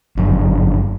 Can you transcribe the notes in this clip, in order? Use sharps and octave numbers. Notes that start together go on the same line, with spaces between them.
G1 F#2